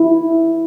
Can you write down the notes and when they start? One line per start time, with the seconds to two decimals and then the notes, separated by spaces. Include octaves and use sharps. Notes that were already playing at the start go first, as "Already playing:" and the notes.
Already playing: E4